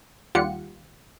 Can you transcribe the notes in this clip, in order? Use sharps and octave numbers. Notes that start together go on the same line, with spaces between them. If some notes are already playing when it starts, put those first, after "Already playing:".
D#2 G3 F4 G4 F#5 C#7